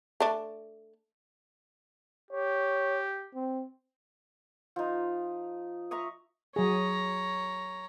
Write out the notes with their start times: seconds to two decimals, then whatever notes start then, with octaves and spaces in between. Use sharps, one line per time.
0.20 A3 D4
2.31 G4 C#5
3.34 C4
4.76 F3 D#4
5.91 E5 A#5 C#6 D#6
6.56 F#3 G#4 C#5 A#5